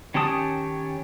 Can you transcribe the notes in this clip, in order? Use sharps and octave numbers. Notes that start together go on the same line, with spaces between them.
D#3 C#4 G4 A5 D#6